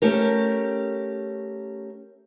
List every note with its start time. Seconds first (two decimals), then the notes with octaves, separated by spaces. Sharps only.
0.02 A3 C#4 G4 A#4